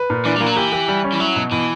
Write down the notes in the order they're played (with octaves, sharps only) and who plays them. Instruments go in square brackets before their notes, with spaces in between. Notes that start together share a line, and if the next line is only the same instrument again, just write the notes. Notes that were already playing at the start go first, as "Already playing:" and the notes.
Already playing: [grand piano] B4
A#2
[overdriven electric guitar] E3 [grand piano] D4
[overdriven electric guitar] G3
[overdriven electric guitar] E3 [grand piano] A#3
[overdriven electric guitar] F#3
[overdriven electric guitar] E3 [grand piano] G4
[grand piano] G4
G3
C#4
[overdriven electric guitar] E3
[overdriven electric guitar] F#3 [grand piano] E4
[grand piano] B2
[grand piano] B2 [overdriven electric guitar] E3